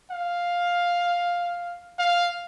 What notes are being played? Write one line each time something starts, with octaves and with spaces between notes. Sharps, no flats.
F5
F5